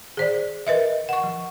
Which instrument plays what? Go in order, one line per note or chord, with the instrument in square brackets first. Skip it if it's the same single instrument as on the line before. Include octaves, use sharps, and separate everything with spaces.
[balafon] G#4 C5 D5
A#4 B4 D#5 E5
F#5 C#6
F3